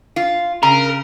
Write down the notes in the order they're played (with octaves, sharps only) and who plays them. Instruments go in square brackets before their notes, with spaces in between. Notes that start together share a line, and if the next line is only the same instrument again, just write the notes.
[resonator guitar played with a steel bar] F4
[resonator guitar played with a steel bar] C#3 [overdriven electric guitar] A#4